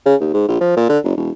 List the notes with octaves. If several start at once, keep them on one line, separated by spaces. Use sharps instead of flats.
C#3
D#2
G#2
A#1
F3
A#2
D3
F#1
E1